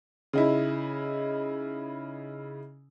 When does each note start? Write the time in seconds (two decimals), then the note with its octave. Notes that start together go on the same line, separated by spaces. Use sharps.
0.33 C#3 D#4 E4